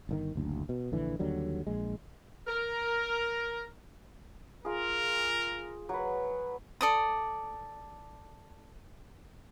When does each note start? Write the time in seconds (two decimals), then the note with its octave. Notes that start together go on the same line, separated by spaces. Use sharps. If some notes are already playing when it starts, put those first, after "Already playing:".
0.09 G1 A#2 D#3
0.35 F#1 D2
0.69 B2
0.92 A#1 D3 E3
1.19 D#2 D3 F#3 G3
1.67 A#1 G#3
2.47 A#4
4.65 F4 G#4 A#4
5.89 F#3 B4
6.81 A4 D5 D#6